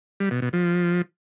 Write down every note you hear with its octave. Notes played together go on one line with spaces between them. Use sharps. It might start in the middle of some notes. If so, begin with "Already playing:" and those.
G3
B2
B2
F3